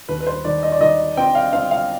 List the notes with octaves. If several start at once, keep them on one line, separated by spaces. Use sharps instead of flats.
D#2 B4
B4
C5
D#3 D5
D#5
D5
D#3 D#5
C4 G5
F5
C4 F5
F5